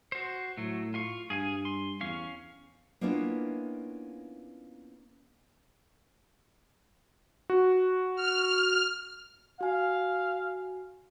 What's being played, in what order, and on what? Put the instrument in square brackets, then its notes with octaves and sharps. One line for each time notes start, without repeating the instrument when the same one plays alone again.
[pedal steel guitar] F#4 C5
[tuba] A2 [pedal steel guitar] F#3 A3
[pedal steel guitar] F4 F5 C#6
[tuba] G2 [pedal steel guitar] G#4 F5 G#5
[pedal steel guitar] C6
[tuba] E2 [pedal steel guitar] C#4 F5 C#6
[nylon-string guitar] A#3 B3 C#4 D4 E4 F4
[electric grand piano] F#4
[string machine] F6
[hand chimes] F#4 G#5 [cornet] F5